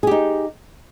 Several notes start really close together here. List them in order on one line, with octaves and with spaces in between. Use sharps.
G#4 G4 D#4